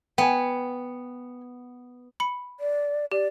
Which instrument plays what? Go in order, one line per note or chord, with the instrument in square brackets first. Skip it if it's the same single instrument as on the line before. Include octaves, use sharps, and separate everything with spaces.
[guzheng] B3 [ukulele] G5 G#5
[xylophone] B5 C#7
[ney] D5
[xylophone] G4 [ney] D5